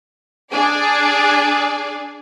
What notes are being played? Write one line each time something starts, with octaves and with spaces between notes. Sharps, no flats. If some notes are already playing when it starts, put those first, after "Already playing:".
D4 G#4 D5